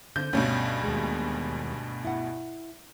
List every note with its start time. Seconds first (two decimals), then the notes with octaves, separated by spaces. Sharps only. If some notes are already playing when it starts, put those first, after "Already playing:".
0.16 D3 C4 G6
0.33 D2 G2 B2 C#4 C#5
0.83 D#2 G#3
2.05 E4 F#5